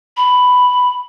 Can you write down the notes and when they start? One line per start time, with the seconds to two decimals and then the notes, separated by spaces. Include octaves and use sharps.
0.17 B5